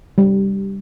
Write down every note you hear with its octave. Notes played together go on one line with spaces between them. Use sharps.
G3